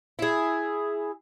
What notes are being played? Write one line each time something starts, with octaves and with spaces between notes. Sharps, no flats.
E4 G#4